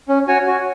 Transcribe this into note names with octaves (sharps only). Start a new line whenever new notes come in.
C#4
F#4 C#5 G#5
F#4